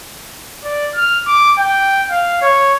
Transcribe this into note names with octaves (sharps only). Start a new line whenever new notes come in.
D5
F6
D6
G5
F5
C#5